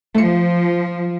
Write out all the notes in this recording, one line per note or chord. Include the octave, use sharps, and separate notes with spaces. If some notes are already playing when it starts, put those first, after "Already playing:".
F3 A3 C#7